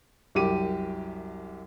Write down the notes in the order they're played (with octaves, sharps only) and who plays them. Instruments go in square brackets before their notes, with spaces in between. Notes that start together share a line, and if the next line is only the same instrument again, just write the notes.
[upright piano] C2 F#2 G4 D6 D#7